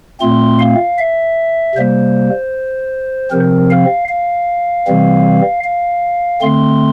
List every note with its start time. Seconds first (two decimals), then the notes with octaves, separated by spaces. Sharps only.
0.21 A#2 A3 C4 C6
0.59 F5
0.98 E5
1.75 C3 G3 A#3 C5
3.31 C3 F3 C4 A#4
3.70 F5
4.08 F5
4.87 C3 E3 G3 C4
5.64 F5
6.41 D3 A3 C4 C6